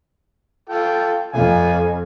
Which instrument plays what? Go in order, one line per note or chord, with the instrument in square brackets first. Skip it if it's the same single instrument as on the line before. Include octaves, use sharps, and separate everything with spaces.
[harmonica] F4 A4 G5
[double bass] F2 [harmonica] F4 G#5